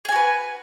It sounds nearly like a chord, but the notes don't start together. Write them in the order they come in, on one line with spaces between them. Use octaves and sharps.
G#4 G#5 F#4 B4